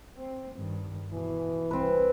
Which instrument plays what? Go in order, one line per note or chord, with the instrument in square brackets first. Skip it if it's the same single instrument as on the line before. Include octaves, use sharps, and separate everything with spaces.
[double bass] C4
G2 D#3
[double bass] B2 [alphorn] E3
[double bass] C2 [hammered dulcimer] C4 B4